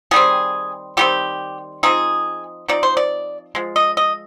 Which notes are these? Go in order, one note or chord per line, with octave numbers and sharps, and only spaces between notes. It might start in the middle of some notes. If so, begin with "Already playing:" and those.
D#3 G3 C4 G#4
D#3 G3 C4 G4
F3 C4 D#4 G#4
F3 C4 D#4 D5
C5
D5
F3 G#3
D#5
D#5